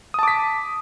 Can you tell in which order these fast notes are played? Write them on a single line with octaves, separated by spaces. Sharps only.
D#6 A5 D6 B6